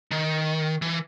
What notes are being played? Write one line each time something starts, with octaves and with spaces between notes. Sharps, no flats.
D#3
E3